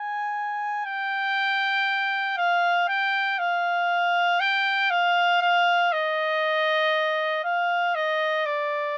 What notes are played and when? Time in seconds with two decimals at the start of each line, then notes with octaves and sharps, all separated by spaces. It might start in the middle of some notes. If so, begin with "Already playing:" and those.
Already playing: G#5
0.86 G5
2.37 F5
2.88 G5
3.39 F5
4.40 G5
4.90 F5
5.42 F5
5.92 D#5
7.44 F5
7.95 D#5
8.46 D5